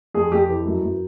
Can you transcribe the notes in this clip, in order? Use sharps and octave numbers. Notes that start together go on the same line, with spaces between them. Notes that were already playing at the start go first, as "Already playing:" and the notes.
F2 G#4
F2 G4
E3
F#2
F#2